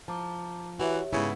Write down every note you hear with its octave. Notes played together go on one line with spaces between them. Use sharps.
F3 A5 A#5 D6
E3 F#4 G4 C#5 E5
G#2 C#3 B3 E4